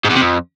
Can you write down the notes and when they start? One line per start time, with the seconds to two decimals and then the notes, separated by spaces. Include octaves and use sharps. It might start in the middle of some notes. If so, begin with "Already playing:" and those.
0.05 G#2
0.10 E2
0.16 C3
0.21 F2